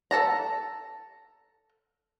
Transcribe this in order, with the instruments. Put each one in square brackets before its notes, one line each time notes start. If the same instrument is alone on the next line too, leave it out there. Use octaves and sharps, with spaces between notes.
[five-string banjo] A4 A5 A#5